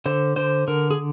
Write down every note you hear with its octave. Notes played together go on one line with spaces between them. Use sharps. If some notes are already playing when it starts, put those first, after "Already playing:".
D3 C5
D3 C5
D3 A#4
G#4